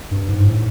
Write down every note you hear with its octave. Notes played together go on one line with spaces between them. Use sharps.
G2
G#2
A2